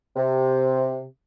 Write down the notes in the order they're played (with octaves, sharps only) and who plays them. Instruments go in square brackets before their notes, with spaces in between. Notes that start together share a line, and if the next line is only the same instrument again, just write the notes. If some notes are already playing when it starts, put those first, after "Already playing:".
[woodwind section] C3